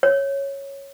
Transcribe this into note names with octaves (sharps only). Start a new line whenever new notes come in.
C#5